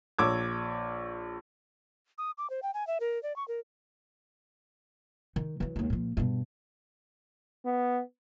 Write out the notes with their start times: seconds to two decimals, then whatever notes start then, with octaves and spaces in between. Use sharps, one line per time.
0.19 A#1 C#5 D6 E6 G#6
2.18 D#6
2.38 D6
2.50 C5
2.63 G5
2.74 G#5
2.87 E5
3.00 A#4
3.23 D5
3.36 C#6
3.48 A#4
5.36 D#3
5.60 E3 F#3
5.76 D#2 G#2
5.90 A#2 F3
6.17 G2 B2
7.65 B3